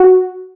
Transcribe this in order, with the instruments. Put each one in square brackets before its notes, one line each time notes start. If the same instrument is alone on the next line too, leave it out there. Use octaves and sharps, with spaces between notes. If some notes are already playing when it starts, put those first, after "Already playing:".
Already playing: [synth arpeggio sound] F#4